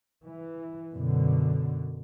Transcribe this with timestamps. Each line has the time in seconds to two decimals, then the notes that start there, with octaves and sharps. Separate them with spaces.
0.23 E3
0.91 F#2 B2 D3